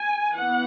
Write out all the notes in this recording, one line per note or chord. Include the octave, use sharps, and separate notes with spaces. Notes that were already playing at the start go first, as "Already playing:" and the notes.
Already playing: G#5
E3 B3 F#5